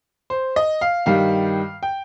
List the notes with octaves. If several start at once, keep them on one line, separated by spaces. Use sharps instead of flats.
C5
D#5
F5
G2 D#3 G3 F5
G5